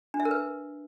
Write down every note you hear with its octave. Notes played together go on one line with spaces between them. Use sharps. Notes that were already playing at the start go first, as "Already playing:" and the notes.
D4
E5
A#4
B4